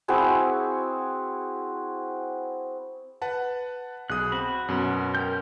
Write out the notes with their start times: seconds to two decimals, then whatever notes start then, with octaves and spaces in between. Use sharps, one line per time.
0.08 C4 E4 F#4 G#4
3.22 B4 F#5 A5
4.10 B1 G#4 D#6 F#6
4.32 C4 F#4 B5
4.69 F#2 B2
5.15 A#4 G5 G6